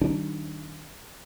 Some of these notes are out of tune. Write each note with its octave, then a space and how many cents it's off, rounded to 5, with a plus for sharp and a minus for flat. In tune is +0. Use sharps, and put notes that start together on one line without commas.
D#3 +0 G3 -30 D4 -15